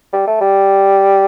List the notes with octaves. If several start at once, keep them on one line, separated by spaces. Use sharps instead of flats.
G3
A3
G3